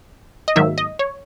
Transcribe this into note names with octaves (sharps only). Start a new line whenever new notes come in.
D#5
G#2 D#3 F#3 A#3 D#4 E5
D#5
C#5